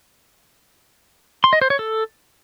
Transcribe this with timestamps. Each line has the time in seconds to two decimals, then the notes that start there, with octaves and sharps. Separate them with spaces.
1.44 C6
1.53 D#5
1.61 C5
1.70 C#5
1.79 A4